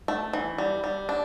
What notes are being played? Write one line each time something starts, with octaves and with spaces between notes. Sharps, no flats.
A3
E3
G3
G3
D4